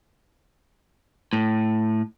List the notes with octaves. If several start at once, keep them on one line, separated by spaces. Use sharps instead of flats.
A2